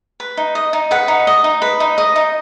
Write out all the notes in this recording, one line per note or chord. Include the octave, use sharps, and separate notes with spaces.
B4
D#4
D#5
D#4
B4 F#5
D#4
D#5
D#4
B4
D#4
D#5
D#4